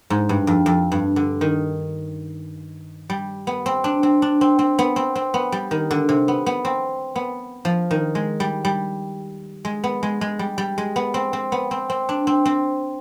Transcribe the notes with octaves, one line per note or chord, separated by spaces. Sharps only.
G#2
G2
F2
F2
G2
D3
D#3
G3
B3
C4
D4
C4
D4
C4
C4
B3
C4
C4
B3
G3
D#3
D3
C3
B3
B3
C4
B3
F3
D#3
G#3
G3
G3
G#3
B3
G#3
G#3
G3
G3
G#3
B3
C4
C4
B3
C4
C4
D4
C4
C4